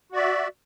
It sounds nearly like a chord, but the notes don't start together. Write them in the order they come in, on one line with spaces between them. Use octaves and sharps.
F#4 D5 E5